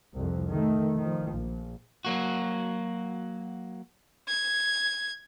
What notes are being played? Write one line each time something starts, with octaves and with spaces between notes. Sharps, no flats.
C2 F2
D#3 A3
D#3 F3
A#1
F#3 A#3 F#4
G#6